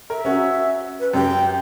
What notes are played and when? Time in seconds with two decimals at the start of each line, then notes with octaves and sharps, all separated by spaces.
0.10 A#4 E5
0.25 C#4 F#4
1.00 B4
1.14 F#2 G4 G5